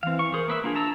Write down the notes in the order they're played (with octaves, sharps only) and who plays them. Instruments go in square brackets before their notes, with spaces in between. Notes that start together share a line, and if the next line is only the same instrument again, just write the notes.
[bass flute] E3 [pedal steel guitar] C4 F5
[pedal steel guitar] C#6
[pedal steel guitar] G#4 C5 [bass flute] A#4
[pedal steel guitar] A#3 B4 E5
[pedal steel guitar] A#3 F4 G#4 [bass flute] D4
[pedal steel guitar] A5 A#5 E6